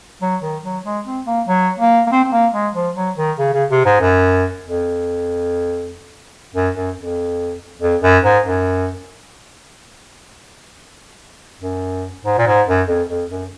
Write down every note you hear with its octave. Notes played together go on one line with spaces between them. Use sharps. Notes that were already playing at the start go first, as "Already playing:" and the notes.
F#3
D#3
F#3
G#3
C4
A#3
F#3
A#3
A#3
C4
C4
A#3
G#3
F3
F#3
D#3
C#3
C#3
C3
G#2
F#2
F2
F#2
F#2
F2
F2
F#2
G#2
F#2
F#2
G#2
A#2
G#2
F#2
F2
F2
F#2